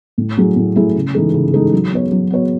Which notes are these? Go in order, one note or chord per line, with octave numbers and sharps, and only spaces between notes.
A2
F#3 A3 E4 G#4
A2
F#3 A3 E4 G#4
C#3
E3 G#3 D#4 A4
C#3
E3 G#3 D#4 A4
F#3
B3 F#4 C#5
F#3
B3 F#4 C#5